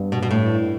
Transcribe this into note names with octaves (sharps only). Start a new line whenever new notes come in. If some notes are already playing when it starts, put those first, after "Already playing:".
Already playing: G2 G3 B3
B2
B2
A2